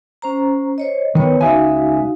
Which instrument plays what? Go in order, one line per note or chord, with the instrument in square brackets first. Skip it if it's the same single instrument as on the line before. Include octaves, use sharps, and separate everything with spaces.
[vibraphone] C#4 C5 A#5
C5 C#5 D#5
[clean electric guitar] D#3 [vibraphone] B3 B4 C#5
[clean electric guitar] C#2 E5 G#5 [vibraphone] D#4 F#4 F5